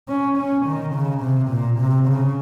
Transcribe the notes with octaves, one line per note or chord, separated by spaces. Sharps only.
C#4
C#4
D#3
C#3
C3
A#2
C3
C#3